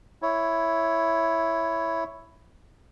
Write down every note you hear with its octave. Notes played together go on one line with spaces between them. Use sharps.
E4 C#5